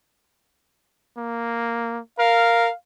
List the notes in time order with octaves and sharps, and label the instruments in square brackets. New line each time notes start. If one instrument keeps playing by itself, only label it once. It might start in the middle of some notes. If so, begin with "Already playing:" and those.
[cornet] A#3
[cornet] A#4 [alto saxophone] F5